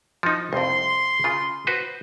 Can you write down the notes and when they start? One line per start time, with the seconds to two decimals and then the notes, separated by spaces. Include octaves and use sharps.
0.23 F3 D#4
0.53 C2 F2 C6
1.24 C#3 F4
1.67 F#4 B4 C5